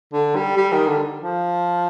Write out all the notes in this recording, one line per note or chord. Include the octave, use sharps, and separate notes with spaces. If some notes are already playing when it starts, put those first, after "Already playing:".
D3
G3
G3
D#3
D3
F3